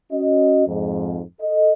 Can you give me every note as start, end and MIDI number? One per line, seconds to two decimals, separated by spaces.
0.12 0.64 61
0.12 0.64 66
0.12 0.64 75
0.67 1.21 41
0.67 1.21 44
1.42 1.72 69
1.42 1.72 75